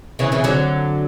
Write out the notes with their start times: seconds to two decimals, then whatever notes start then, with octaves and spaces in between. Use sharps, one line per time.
0.19 C#3 E3
0.32 C#3 E3
0.44 D3 F#3